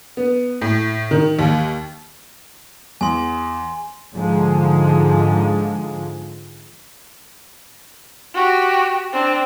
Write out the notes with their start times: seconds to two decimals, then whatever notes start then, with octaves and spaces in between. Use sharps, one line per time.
0.17 B3
0.61 A2
1.11 D#3
1.39 D#2
3.01 E2 G#5 C6
4.14 G#2 D3 F3 G#3
8.34 F#4 G4
9.12 C4 D4